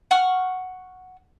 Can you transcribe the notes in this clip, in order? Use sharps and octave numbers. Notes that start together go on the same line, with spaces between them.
F#5 C#6 F6